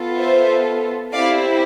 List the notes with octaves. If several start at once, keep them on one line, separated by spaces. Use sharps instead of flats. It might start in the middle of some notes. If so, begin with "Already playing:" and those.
Already playing: B3 F4 A4
C5 E5
C4 E4 G4 D5 F5